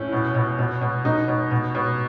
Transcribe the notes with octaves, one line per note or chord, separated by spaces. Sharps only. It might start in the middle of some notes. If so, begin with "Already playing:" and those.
Already playing: A2 C#4
B2
B2
B2
B2
B2 D#4
B2
B2
B2